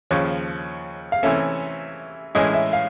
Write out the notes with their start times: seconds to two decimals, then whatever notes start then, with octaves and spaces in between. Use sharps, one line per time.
0.11 D#2 C#3 F3 C#5
1.12 F5
1.23 C3 E3 A3 C#4 E5
2.35 A2 E3 G#3 C#4 E4 D#5
2.54 E5
2.73 F5